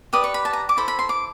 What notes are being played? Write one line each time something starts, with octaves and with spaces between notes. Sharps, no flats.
G4 B4 D5 D#6
C#6
B5
A5
A#5
D6
E4 A4 C5 B5
B5
C6
D6